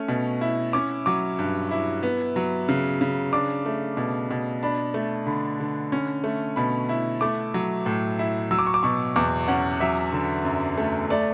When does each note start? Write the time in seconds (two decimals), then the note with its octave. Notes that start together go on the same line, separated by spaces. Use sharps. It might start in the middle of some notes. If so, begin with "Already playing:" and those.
Already playing: A3 C#4
0.08 B2
0.41 E4
0.73 C#4 D6
1.06 F#3 D6
1.39 G2
1.71 E4
2.03 B3
2.36 F#3
2.69 C#3
3.01 C#3
3.33 D4 D6
3.66 A3
3.97 B2
4.31 B2
4.63 D4 B5
4.94 A3
5.27 D3 B5
5.60 D3
5.92 C#4
6.24 A3
6.56 B2 B5
6.89 E4
7.21 A3 D6
7.54 F#3
7.86 A2
8.19 E4
8.51 F#3 E6
8.59 D6
8.66 C#6
8.74 D6
8.83 B2 C#6
9.16 E2 D6
9.48 C#4 F#5
9.80 F#3 E5
10.12 D3
10.45 F#2
10.78 A3
11.10 A3 D5